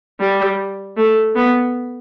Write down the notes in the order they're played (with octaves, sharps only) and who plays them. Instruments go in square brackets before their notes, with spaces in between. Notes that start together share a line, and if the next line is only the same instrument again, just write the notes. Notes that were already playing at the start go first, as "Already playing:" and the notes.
[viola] G3
A3
B3